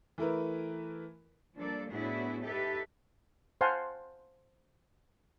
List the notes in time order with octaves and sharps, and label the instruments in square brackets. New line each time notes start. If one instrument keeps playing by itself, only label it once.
[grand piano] E3 A3 E4 A#4 B4
[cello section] F3 G3 A#3 D4 A4 D5
A2 B3 D4 E4 F#4 G#4
D#4 G4 A4 B4 E5
[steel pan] C5 F5 F#5 G#5 A5 C6